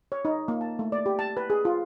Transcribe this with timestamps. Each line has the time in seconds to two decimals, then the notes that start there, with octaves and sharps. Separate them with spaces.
0.12 C#5
0.25 D#4
0.48 A#3
0.61 A5
0.79 A3
0.92 D5
1.06 G4
1.19 A5
1.37 B4
1.50 G#4
1.65 F4